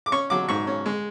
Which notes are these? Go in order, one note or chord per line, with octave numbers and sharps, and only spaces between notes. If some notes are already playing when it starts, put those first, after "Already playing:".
D6
C#4 C#6
F#3 D6
G#2 C#6
C#4
G#3